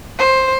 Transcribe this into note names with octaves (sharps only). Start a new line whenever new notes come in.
C5